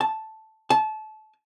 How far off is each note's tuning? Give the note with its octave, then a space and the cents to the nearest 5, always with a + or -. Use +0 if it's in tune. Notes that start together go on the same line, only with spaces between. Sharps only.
A5 -5
A5 -25